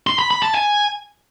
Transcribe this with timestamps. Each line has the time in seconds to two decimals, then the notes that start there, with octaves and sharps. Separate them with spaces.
0.07 C6
0.19 B5
0.31 B5
0.43 A5
0.54 G#5